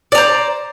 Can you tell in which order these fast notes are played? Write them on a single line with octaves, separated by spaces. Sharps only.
D5 A#5 C5